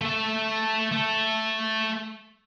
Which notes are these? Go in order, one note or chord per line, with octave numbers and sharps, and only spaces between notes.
A3 E5
A3 A4